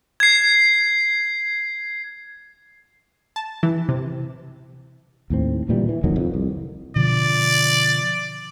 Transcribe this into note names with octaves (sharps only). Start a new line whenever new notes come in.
G#6 C7
A5
E3
C3
D#2 A2 C4
D2 A#2 E3 G3
E3
F#1 F2 D#3 F#3
F2
C2
B2 D3 F3 D5